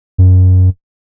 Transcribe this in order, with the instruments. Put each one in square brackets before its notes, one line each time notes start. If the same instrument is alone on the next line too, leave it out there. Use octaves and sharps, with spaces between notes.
[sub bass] F#2